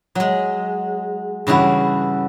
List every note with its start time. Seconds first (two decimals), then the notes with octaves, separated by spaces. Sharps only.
0.15 F#3 G#3
1.47 G2 C#3 E3 E4 F#4